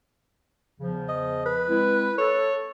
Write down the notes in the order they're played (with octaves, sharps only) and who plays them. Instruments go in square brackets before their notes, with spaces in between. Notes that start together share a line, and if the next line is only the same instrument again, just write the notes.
[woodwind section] E2 C#3 F3
[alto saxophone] D#5
B4
[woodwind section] G#3 C4 E4
[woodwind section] A4 [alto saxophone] C#5